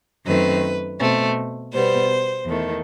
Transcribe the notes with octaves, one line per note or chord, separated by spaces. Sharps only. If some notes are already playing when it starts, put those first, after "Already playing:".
F#2 D#3 A3 C4 B4
B2 A3 C4
B2 G3 B3 C5
E2 D#3 A3